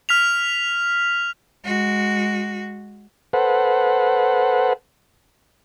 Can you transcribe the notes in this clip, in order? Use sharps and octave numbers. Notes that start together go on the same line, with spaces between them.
F6 B6 F7
G#3 F#4
A4 B4 C5 F#5